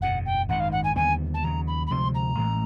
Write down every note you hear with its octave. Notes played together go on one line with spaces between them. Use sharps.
F#1 E2 B2 F#5
G5
G#1 F#2 D#3 F#5
F5
F#5
G#5
D#2 D3 G3 B3 G#5
A5
D#2 C#3 F#3 A#5
B5
B5
D2 C3 F3 G#3 C6
A#5
A1 A2 E3 G#3